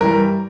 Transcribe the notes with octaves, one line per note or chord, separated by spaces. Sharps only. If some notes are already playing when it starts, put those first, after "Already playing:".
G2 E3 G3 A#4